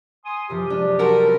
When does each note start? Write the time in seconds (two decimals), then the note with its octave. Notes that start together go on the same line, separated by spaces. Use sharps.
0.25 G#5 C6 D#6
0.50 F#2 C3 F3 G4
0.70 G#3 D4
0.99 F3 F#4 A4 A#4
1.25 C4 C#4 B4